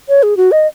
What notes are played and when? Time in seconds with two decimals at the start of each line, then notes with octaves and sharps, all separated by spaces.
0.09 C#5
0.23 G#4
0.37 F#4
0.52 D#5